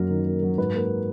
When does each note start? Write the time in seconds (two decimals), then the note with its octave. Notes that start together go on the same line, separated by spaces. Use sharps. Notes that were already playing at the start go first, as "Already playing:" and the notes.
Already playing: F#2 F#3 A#3 A#4
0.10 D#3
0.27 A#3
0.42 F#3
0.58 G#2 B4
0.74 A#3